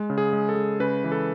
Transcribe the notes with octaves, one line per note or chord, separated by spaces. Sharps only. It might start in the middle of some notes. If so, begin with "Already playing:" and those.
Already playing: G#3
C#3
G#4
G#3
A4
G#3
C#3 B4
E3
A4